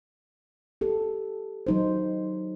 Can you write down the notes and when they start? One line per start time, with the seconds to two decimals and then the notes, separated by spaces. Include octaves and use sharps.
0.81 G4 A4
1.67 F#3 D#4 C5